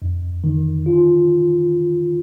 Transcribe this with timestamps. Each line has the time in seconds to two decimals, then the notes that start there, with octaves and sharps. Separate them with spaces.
0.02 F2
0.44 D#3
0.86 F4